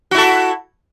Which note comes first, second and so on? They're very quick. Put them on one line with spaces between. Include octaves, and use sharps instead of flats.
F#4 E4 A4